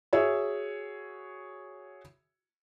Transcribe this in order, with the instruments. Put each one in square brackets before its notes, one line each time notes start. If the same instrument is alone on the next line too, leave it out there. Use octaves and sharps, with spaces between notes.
[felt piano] F#4 G#4 C#5 E5 E6